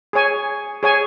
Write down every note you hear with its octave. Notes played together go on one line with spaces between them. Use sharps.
G#4 C#5 G#5
G#4 C#5 G#5